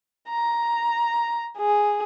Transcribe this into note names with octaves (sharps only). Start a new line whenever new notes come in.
A#5
G#4